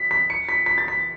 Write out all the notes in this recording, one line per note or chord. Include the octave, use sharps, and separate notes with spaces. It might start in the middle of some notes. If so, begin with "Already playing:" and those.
Already playing: B6
B6
C#7
B6
B6
A6
B6